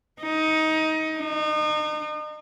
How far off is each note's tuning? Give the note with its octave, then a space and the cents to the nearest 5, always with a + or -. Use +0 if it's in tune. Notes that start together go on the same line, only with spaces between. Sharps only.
D#4 +20
D#4 -35